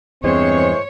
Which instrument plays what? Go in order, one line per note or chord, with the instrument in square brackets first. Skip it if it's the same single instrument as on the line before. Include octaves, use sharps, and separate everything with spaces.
[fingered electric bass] E2 G2 [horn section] E3 G#3 C5 [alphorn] C4 [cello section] C#5